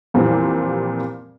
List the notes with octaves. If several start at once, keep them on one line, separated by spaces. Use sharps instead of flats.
F2 A#2 E3 G3 C4